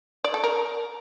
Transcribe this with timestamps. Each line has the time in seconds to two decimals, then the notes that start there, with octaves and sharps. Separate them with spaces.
0.24 D5
0.34 A4
0.44 A#4